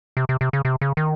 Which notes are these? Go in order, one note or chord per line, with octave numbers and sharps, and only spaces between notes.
C3
C3
C3
C#3
C3
C#3
D#3